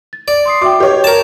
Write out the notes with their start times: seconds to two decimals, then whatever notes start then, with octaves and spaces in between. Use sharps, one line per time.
0.13 A6
0.28 D5
0.45 C6 D#6 C7
0.62 F#4 E5 G5 D6
0.80 G4 B4 C#5 D#5 G5
1.04 A#4 A5